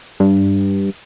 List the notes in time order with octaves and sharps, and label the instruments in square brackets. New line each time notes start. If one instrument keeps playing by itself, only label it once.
[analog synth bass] G2